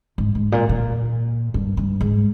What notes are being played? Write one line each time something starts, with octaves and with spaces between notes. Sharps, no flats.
G#2
G#2
A#2
A#2
G2
G2
G#2